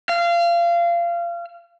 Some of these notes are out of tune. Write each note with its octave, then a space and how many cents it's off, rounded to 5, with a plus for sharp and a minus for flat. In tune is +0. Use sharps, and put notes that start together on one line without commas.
F5 -25